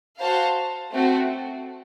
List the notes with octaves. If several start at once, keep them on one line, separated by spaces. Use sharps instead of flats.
F#4 C5 F5 A5
A3 C4 F#4